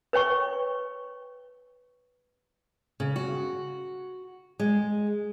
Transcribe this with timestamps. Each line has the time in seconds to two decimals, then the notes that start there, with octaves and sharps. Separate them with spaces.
0.13 B4 C#5 G5 C#6
3.00 C#3
3.16 F#4
4.59 G#3